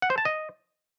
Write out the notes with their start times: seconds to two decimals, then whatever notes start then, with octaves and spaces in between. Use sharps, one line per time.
0.02 F#5
0.10 C5
0.18 A5
0.25 D#5